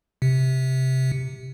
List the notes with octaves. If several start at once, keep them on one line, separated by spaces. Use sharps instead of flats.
C3